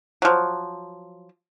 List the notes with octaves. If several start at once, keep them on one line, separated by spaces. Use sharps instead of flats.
F3 F#3